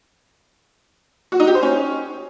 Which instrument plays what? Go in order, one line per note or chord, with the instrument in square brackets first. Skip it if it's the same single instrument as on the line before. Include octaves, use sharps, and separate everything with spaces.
[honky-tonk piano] F#4
D#4
G4
C5
C#4